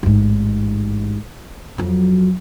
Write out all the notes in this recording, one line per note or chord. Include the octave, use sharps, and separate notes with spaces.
A1 G#2
F2 F#3